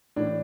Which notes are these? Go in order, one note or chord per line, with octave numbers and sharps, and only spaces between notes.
A2 E3 D4